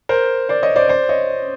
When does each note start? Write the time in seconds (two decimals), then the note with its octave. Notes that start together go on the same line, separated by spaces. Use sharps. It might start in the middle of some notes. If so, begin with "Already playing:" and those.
0.09 A#4 C5
0.49 C5 D5
0.62 C#5 D#5
0.76 C5 D5
0.89 C5 D5
1.09 C#5 D#5